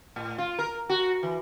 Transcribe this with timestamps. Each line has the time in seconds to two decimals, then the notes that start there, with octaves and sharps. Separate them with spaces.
0.16 A2
0.38 F4
0.59 A#4
0.89 F#4
1.23 E3